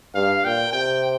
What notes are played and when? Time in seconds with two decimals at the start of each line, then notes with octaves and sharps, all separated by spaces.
0.15 G2 F5
0.45 A#2 G5
0.73 C3 G5